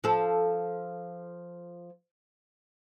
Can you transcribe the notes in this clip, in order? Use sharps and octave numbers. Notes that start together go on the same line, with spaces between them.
F3 A4